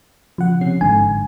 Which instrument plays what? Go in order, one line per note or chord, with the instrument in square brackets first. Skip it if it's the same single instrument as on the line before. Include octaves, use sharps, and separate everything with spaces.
[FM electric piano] C#3 F#5 [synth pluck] F3
[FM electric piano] C3 C#4 C7
[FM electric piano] G1 G#2 D3 [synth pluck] G#5